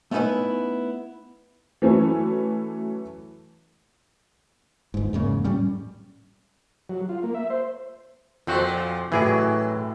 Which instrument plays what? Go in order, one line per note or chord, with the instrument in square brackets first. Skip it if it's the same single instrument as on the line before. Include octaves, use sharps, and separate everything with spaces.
[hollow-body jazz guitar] A3 B3 C#4 D#4 E4 B4
[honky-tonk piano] E3 F#3 A3 C#4 E4
[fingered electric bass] G1 G#2
E2 G#2 C#3 A#3
A2 F#3 G3 C#4
[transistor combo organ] F#3
F4
A#3
E5
C5
[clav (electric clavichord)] F2 C4 F#4 [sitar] A#2 F3
[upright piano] A1 A2 [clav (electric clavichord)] E3 G#4 D5 [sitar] F#3